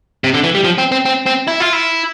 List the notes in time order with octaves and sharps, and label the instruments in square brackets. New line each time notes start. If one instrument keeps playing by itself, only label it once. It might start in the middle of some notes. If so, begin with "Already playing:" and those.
[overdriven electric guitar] C3
D3
E3
G3
F3
C4
C4
C4
C4
E4
F4
E4